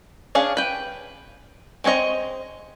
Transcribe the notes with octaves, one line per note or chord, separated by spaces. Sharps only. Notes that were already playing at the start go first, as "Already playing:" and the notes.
C#4 D4 G#4 F5
B4 G5
G#3 C4 C#5 D#5 A#5